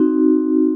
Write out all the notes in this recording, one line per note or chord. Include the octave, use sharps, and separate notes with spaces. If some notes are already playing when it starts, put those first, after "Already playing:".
Already playing: C4 D#4 F#4